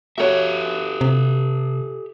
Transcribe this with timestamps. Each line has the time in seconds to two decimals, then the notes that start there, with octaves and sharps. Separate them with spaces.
0.18 F#4 G4 A4 C#5 E5
1.01 C3